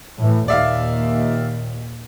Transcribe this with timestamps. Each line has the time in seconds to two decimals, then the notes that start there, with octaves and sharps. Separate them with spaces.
0.19 A2 E3
0.48 D#2 A#2 D5 E5 F5